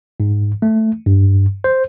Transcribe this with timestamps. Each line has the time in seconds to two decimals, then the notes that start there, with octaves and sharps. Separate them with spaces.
0.20 G#2
0.62 A3
1.06 G2
1.64 C5